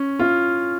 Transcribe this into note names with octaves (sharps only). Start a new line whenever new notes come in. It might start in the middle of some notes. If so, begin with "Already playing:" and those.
Already playing: C#4
F4